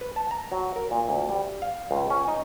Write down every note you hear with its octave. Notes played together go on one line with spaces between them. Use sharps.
B4
A5
A#5
F#3
A#4
A#2
D2
G3
F5
C#2
C#4
D#4